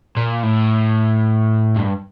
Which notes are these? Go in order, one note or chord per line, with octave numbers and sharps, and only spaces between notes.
A#2
A2
G2